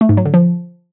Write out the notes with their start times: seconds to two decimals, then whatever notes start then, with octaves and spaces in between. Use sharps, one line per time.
0.01 A3
0.09 G#2
0.17 F#3
0.26 D3
0.34 F3